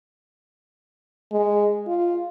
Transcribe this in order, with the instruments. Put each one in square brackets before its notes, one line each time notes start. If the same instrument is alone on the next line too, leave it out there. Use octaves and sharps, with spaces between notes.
[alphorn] G#3
F4